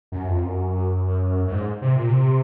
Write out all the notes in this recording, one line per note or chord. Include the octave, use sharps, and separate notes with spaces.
F#2
F2
F#2
F#2
G#2
C3
A#2
C3